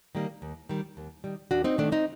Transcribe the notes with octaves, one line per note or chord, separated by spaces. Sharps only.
D#3 G3 A#3
D#2
D#3 G3
D#2
D#3 G3
D#2 D4 F#4
C4 D#4
D#3 A3 D4
C4 D#4